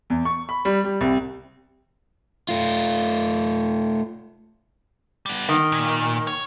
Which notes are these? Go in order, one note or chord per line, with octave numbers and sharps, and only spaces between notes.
E2
C#6
B5
G3
G3
C2
A3 F4
G3 B3
D#3
A#2
C#5